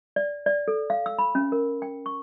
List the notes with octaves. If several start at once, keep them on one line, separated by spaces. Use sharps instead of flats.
D5
D5
A4
F5
E6
B5
C#4
A#4
G5
C#6